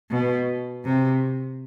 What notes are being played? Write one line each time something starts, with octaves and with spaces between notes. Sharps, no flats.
B2
C3